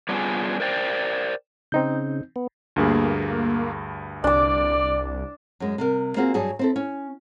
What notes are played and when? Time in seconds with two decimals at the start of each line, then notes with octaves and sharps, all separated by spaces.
0.09 G3 B3 C#4 D4 F4 G#4
0.60 A#4 C5 D5 G5
1.72 C#3 C4 D#4 G6
2.36 B3
2.76 D2 G2 A#3 G#4
4.24 C2 D4 D5 D6
5.60 F#2 G#3
5.78 C3 G3 A#4
6.16 A#3 C4 F4 F#4 G#4
6.34 G2 F#3 G#4 A5
6.59 C4 E4 A4
6.76 C#4